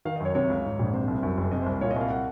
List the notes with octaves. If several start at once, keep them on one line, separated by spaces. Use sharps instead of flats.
D#3 F5
D#5
F#2 C#5
C3 C#5
C#2
G#2
A#1
C3 C5
C2
F#2
F#1
C3 D#5
C5
C2
A#2 C#5
D#5
C2 F5
F#5